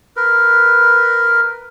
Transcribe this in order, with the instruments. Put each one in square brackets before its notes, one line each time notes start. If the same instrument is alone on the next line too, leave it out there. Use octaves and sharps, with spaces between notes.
[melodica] A#4 B4